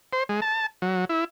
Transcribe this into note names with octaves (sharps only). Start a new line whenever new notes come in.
C5
G#3
A5
F#3
E4